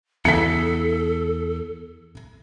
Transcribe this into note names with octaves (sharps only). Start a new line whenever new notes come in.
E2 A4 B6 C#7